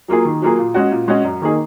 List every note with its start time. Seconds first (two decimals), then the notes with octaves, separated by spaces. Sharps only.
0.08 F#3 A#3 F4 G#4
0.25 D#3
0.42 F#3 A#3 F4 G#4
0.58 A#2
0.74 G#3 C#4 F#4
0.91 A#2
1.08 G#3 C#4 F#4
1.25 F#2
1.42 D#3 A#3 D#4 G#4